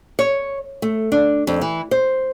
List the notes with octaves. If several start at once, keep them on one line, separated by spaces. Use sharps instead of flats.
C#5
A3
D4
F2
E3
C5